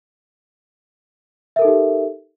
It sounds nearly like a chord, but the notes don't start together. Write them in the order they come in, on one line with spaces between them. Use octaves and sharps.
E5 A#4 A4 D#4 G4